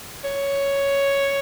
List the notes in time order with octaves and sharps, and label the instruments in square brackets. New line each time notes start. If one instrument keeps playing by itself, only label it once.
[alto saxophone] C#5